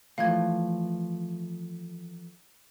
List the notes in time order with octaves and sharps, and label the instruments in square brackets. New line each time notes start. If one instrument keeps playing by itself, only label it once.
[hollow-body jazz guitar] E3 F3 A3 [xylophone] F5 G#6